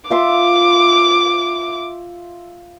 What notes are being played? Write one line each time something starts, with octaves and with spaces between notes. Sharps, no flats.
F4 E5 C6 D6